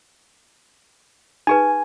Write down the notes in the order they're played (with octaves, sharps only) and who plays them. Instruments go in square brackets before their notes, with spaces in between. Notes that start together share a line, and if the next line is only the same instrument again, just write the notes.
[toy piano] D#4 G#4 B4 [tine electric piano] G#5